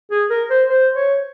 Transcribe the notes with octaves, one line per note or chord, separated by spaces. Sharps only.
G#4
A#4
C5
C5
C#5